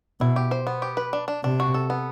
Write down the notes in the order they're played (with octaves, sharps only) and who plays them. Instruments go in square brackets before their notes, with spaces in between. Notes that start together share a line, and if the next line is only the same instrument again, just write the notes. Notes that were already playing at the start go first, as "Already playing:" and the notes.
[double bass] B2 [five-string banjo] E4
[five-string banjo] G4
C5
B3
G4
B4
D4
D4
[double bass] C3 [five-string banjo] D4
[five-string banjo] F#4
A4
B3